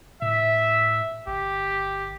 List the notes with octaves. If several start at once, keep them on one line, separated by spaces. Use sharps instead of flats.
A2 E5
G1 G4